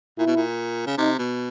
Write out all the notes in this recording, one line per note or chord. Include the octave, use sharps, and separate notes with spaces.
A#2 E4
B2
A#2
C#3
C3 D#4
B2